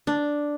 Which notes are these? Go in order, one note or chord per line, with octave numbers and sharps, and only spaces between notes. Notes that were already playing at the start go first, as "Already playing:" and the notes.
D4